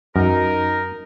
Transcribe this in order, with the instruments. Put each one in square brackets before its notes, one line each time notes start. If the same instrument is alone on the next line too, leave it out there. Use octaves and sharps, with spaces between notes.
[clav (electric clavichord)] F#2 [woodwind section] D#4 A#4